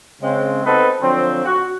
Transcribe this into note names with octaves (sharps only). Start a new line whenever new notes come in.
C#3 G#3 C4
B3 C4 D#4 F#4 A4 B4
D3 F3 F#3 C4
F#4